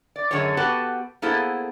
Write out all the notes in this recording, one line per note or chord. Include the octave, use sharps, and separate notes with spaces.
D5
F#2 D3 D#3 G#4 C#5
B3 F#4 G4 A4 B4
A#3 B3 E4 G#4 A4 C5